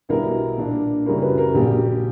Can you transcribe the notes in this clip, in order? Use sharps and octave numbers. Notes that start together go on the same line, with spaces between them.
B1 B2 G3 B3 E4 A#4
A#2 A#3 D4
F#2 C#3 G3 C#4 E4 A#4
B4
A#4
A#1 A#2 F#3 G4